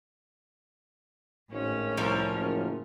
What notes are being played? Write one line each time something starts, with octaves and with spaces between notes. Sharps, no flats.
G#1 A2 C#4
C2 F3 A#4
F#1